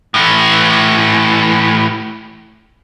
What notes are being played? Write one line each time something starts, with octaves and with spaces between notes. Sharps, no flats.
A2 E3